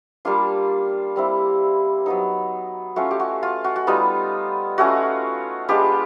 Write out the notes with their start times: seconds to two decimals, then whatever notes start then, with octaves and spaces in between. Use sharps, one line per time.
0.25 G3 A#3 D4 F4
1.16 G3 C4 E4
2.06 F#3 B3 D#4
2.96 A3 C#4 F4 F#4
3.11 G4
3.20 F#4
3.43 F4
3.64 F#4
3.76 F#4
3.87 G3 B3 D#4 F4
4.78 A3 C#4 F4 F#4
5.69 G#3 B3 D4 F4 G4